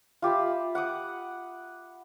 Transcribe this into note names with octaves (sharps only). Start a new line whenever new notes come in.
F4 G4 E5 B5
F#5 D6 D#6